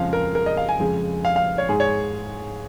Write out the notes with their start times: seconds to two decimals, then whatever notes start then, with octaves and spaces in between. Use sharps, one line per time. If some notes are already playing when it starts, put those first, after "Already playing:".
Already playing: F2 C#3 F3 G#3 F5
0.13 A#4
0.35 A#4
0.46 D#5
0.57 F5
0.69 G#5
0.80 F2 C#3 G#3
1.25 F5
1.36 F5
1.58 C#5
1.69 G#2 G#3 G#4
1.80 C#5